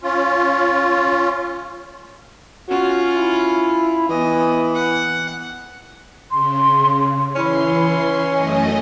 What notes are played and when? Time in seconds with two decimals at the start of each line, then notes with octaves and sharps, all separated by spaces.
0.01 C#4 F4
2.69 C#4 F4 F#4
3.17 E4
4.09 E3 B3 D#5
4.75 F#5
6.31 C#3 C6
7.35 E3 C#4 E4 C6
8.32 F#2 A3 D#5 G#5